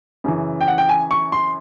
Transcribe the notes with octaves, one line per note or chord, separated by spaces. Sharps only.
F#2 C#3 E3
G5
F#5
G5
G#5
C#6
C6